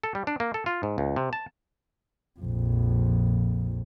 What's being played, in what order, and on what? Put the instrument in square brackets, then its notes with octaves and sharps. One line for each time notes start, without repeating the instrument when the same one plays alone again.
[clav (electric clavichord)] A4
G3
D4
A#3
A4
F4
G#2
C#2
C3
A5
[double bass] A#1 F2